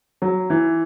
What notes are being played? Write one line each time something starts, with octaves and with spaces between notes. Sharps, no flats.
F#3
E3